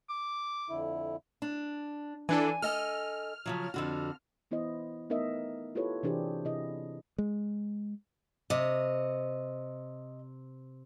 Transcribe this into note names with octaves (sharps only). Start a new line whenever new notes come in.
D6
F2 D3 E4
D4
E3 D4 A4 G#5
A4 D#5 G#5 F6
C#3 F3 F#3
F2 D3 F#4
E3 B3 E4 C5 D#5
A3 B3 D#4 A#4 D#5 E5
E4 F4 G4 A4 B4 C#5
C3 E3 D4 G4 G#4 C5
C3 E4 G#4 D#5
G#3
C3 D#5